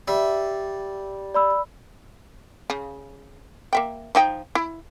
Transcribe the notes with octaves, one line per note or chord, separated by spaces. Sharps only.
G3 E5
D5 B5 E6
C#3
A#3 E5 G5
F3 D#4 G5
E4